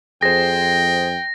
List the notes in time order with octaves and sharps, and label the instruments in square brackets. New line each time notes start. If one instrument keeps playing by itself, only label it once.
[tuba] F2 [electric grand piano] G#4 C5 [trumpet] G5 [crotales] A#6